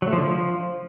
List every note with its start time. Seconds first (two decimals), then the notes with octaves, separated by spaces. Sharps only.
0.02 F#3
0.07 A3
0.13 F3
0.18 D3
0.23 F3